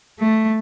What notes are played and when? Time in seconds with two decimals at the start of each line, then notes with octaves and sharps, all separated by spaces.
0.20 A3